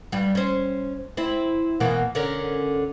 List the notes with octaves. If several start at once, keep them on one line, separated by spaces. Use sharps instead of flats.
G2 G3
C#4 C5
C4 E4
B2 E3 A#3
D3 C#4 A#4